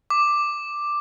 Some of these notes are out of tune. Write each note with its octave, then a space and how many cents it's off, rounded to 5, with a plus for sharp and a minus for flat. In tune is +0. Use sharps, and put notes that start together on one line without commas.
D6 +5